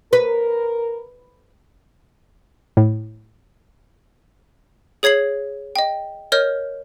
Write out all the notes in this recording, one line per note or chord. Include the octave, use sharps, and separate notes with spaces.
A#4 B4
A2
G#4 C#5 G#6 C7 F#7
D#5 G5
A#4 C#5 D#5 F6 G6